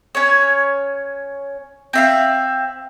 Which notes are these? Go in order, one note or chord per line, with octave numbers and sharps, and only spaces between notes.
C#4 C#5
C4 E5 F5